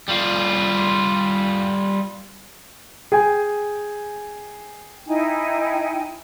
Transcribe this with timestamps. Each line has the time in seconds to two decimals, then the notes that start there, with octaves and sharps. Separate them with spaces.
0.09 G3 F4
3.12 G#4 G5 G#5
5.06 D#4 E4 G5 G#5